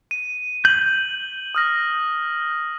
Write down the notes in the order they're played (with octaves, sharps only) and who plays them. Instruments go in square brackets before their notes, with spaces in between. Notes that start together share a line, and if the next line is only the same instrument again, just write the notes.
[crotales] D#7
[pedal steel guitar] G6 [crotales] F#7
[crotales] D#6 F6 A#6